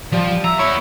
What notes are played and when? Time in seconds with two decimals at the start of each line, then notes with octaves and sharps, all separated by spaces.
0.12 F3 G3
0.44 E5 A#5
0.59 B3 E4 C#5